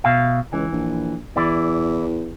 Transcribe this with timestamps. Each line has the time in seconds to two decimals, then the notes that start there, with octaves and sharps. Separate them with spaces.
0.04 B2 E5 F5
0.53 C#2 E3
0.72 A#1
1.36 E2 E3 E4 D5